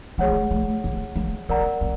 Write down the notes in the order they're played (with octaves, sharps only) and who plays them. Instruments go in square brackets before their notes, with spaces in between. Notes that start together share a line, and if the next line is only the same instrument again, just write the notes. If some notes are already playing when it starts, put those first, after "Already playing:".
[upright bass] G#3 [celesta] G#4 C#5 F#5
[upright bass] A3
G#3
A3
A#3
A#3
[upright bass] B3 [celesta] A#4 D5 F#5 A#5
[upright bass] C4